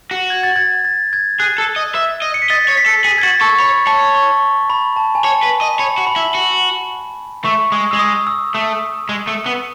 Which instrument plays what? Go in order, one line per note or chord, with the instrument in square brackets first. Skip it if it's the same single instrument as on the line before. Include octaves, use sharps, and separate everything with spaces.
[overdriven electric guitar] F#4
[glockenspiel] G#6
A6
G#6
A6
G#6
[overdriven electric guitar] G#4 [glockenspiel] F#6
[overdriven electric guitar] A4
D#5
E5
D#5
[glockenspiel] C#7
B6
[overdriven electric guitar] D#5 [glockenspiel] A6
[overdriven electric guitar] C#5
[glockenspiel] B6
[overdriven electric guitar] A4
[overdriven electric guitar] G#4 [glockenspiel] B6
[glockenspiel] G#6
[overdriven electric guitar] F#4 [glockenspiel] A6
[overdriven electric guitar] A4 [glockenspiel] C#6
[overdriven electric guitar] C#5 [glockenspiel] B5
[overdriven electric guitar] C#5 [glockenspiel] A5
[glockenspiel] C#6
B5
A5
G#5
[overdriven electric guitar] C#5 [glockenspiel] A5
[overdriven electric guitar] B4
D#5
[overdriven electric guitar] C#5 [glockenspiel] B5
[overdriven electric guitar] F#4
[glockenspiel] B5
[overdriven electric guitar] E4
F#4
[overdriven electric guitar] A3 [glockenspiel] C#6
[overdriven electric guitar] G#3 [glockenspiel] D#6
[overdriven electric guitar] G#3 [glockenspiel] E6
[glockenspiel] D#6
E6
[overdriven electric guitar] A3 [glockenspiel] D#6
[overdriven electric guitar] G#3
A3
B3